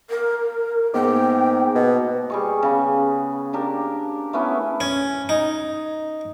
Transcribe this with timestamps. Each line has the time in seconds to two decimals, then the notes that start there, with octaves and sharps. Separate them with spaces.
0.10 A#4
0.94 G#2 A#3 B3 G5 D6
1.75 B2
2.30 G3 G#4 C#6
2.63 C#3 B3
3.53 A#3 D4 G4 A#4
4.33 A3 B3 C#4 E4
4.80 C#4
5.29 D#4